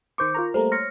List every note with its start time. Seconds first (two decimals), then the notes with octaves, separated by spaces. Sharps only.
0.18 D#3 C5 C#6 D6 G6
0.34 F4 A#4 A#5
0.54 G3 A3 A#3 C5 A#5
0.72 C5 C#5 F6 A#6 C#7